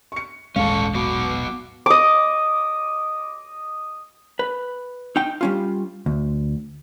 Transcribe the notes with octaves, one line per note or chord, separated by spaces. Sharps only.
C#6 C#7
D#1 G#1 G#3 C#4 A4 F5 C#6
F#3 B3 F#4 D6
D#5 D6
B4
D#4 G5
G3 C#4 F4
D2